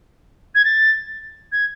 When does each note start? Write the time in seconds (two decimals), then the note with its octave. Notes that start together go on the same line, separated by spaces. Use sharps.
0.55 G#6
0.65 A6
1.52 G#6